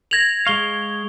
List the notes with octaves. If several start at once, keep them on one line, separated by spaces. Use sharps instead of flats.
G#6 A#6 F7 F#7
G#3 F5 C#6 G7